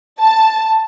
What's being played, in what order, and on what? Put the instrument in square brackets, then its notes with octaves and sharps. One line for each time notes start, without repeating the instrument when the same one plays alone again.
[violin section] A5